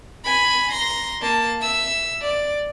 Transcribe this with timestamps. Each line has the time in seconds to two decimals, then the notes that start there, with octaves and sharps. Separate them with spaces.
0.24 G#5 B5
0.72 A#5 C6
1.21 A#3 A5
1.60 E5 E6
2.21 D5